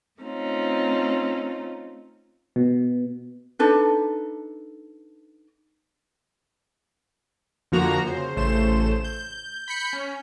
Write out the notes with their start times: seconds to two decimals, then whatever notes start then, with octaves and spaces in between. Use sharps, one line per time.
0.21 A3 C4 C#4 D#4 F4
2.56 B2
3.59 D4 D#4 A4 B4
7.72 F2 D3 F3 A#3 F#4 A#5
8.06 C#3 C5
8.36 A1 C#3 A3 C5 E7
9.04 G6
9.68 B5 G6 B6 C#7
9.93 C#4